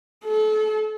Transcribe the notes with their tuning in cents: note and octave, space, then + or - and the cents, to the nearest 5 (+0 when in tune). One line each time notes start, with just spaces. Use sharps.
A4 -30